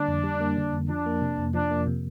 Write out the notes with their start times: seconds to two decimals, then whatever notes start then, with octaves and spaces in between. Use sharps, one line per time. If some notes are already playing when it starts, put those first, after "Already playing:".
Already playing: D3 G3 A#3 D4
0.08 F2
0.24 G3
0.40 A#3
0.57 D3
0.73 F2
0.89 F3 D4
1.06 A#3
1.22 C3
1.38 F2
1.54 F3 D4
1.71 A#3
1.87 C3